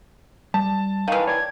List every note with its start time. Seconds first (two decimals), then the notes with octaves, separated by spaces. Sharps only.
0.54 G3 A5
1.08 D#3 E3 F5
1.27 C#5 D5 G5 G#6